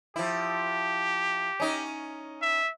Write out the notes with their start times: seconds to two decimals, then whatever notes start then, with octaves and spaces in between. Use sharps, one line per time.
0.16 F3 E4 G4
1.60 C#4 D#4
2.42 E5